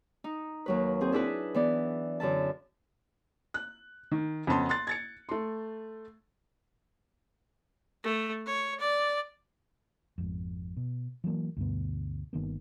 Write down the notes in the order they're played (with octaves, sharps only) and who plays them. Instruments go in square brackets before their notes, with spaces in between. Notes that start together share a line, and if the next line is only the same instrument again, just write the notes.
[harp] D#4
D#2 F#3 B4
C4 G#4
D4 E4 G#4 B4
E3 B3 D5
F#2 D3 E4 A5
[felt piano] F#6
D#3
F2 C#3 B3 A5 C6
C6 F#6 A6
G#6 A6 C#7
A3 C6
[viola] A3
C#5
D5
[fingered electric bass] G#1 F2
B2
E3 F#3 G#3 A#3
D2 G2 B2 B3
G1 D#3 A#3 B3